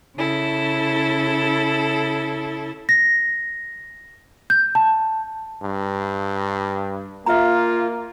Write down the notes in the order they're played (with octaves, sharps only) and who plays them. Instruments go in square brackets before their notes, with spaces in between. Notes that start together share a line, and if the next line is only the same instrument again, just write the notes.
[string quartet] C#3 E4 A4
[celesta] A#6
G6
A5
[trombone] G2
[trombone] A#3 [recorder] F4 [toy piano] E5 A#5